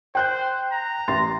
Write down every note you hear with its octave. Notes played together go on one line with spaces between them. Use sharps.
C5 G5 F#6 G6
A#5
A1 C6 A6